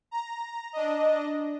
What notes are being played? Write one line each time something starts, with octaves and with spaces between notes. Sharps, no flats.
A#5
D4 D#5